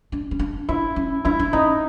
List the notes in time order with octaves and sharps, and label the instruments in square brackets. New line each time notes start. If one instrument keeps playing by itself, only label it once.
[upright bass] D4
C#4
D4
[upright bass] D4 [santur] E4
[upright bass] C#4
[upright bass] D4 [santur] E4
[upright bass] D4
[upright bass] C#4 [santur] D#4